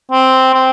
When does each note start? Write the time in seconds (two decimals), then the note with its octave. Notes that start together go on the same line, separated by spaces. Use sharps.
0.12 C4
0.54 C4